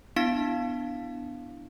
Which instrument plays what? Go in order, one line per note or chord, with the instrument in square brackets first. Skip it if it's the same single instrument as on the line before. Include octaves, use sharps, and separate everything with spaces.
[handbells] B3 D4 E4 F5 B6